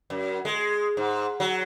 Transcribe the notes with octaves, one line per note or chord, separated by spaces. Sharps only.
F#2
G#3
G#2
F#3